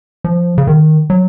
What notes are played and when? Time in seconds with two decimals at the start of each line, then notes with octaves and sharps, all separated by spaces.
0.24 F3
0.58 C#3
0.67 D#3
1.10 F#3